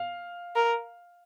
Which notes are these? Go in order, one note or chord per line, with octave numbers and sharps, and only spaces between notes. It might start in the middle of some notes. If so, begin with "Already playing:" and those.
Already playing: F5
A#4